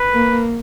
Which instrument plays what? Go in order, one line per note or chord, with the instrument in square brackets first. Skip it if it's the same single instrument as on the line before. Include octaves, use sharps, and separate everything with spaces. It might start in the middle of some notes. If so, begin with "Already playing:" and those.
Already playing: [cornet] B4
[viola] A#3